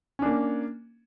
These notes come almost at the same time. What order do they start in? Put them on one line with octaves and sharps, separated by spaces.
C#4 D4 A#3